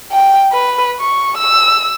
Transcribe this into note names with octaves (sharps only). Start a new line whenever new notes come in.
G5
B4
C#6
E6